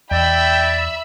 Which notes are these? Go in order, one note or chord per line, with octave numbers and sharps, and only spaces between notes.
E2 D5 E5 G5 B5 E6